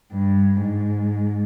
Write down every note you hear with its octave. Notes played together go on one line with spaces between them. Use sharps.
G2
G#2